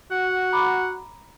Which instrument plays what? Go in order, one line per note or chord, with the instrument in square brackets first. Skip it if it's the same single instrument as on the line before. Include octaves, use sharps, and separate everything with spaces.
[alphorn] F#4 [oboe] F#5
[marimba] A#5 B5 D6